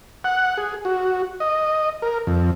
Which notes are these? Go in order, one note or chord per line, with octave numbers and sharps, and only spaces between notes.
F#5
G#4
F#4
D#5
A#4
F2